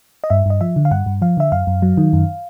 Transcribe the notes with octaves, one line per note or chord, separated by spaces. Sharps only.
D#5
G2 E5
G2 D#5
F3 E5
D3
F5
G2 F#5
G2
F3 F5
D3 E5
F#2 F5
F#2
F#3
D#3
F#2